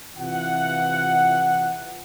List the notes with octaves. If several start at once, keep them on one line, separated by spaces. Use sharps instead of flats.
C3 E3 F4 F#5